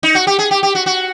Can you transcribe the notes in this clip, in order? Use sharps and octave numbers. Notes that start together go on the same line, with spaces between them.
D#4
F#4
G4
G#4
G4
G4
F#4
F#4